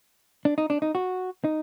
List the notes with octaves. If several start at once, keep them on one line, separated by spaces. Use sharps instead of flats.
D4
D#4
D4
D#4
F#4
D#4